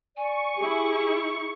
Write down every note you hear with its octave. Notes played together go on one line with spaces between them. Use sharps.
D5 G#5 C#6
E4 G4 G#4